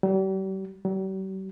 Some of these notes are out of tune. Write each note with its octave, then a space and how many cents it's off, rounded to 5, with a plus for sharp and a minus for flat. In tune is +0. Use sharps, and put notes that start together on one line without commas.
G3 -40
G3 -45